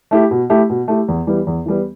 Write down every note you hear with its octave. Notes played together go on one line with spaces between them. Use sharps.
A3 E4 G4
B2
A3 E4 G4
B2
A3 E4 G4
E2
E3 G3 B3
E2
E3 G3 B3